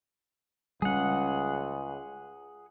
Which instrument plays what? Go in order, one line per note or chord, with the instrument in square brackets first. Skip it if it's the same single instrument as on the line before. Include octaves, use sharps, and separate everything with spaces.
[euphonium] C#2 [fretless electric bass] G3 C#4 [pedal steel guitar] G#4 F#5